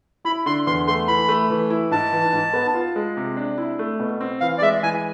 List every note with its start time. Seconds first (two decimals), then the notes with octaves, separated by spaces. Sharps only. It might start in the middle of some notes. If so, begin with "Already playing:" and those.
0.25 E4 B5
0.46 D3 C6
0.67 E2 C6
0.87 A3 C6
1.08 E3 B5
1.29 A3
1.50 E3
1.70 E4
1.91 G#2 A5
2.12 E3
2.33 G#2
2.53 B3
2.74 F4
2.96 G#3
3.17 C3
3.37 D4
3.58 E4
3.79 A3
4.00 B2
4.21 C4
4.41 E3 F5
4.58 D5
4.62 G#3 E5
4.83 E3 G#5